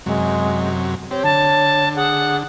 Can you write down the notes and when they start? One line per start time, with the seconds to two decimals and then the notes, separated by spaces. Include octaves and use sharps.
0.06 F#2 C3 F#3 G#3
1.11 C4 G4 C#5
1.24 D3 A5
1.96 G#4 F#5